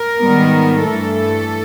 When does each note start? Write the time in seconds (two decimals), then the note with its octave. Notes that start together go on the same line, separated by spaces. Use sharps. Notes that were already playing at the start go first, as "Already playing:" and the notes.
Already playing: A#4
0.20 G#2 D#3 G3 B3
0.86 G2 E3 A3 A4